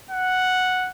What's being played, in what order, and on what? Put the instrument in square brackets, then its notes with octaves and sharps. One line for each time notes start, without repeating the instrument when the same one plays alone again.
[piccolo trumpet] F#5